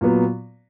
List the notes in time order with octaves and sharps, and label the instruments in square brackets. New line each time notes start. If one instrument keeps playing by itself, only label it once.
[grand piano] A#2 F#3 B3